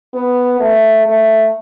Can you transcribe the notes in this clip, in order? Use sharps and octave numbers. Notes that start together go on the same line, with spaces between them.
B3
A3
A3